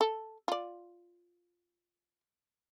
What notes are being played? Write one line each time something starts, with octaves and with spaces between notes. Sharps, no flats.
A4
F4 D5